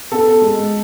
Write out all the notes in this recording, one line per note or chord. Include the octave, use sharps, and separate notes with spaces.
B3 A4
G#3